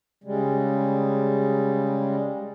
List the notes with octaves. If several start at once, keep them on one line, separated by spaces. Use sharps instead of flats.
C#3 G3 G#3